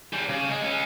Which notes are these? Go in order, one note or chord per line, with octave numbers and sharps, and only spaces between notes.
G#3 G4
C#3
G#3
G#3 C#4